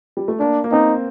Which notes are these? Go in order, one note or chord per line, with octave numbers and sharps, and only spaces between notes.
G3
A3
A#3 D4
A#3
C4 D#4